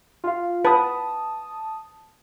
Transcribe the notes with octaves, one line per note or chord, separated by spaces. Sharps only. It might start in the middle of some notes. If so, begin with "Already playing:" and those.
F4 F5
B4 A5 D#6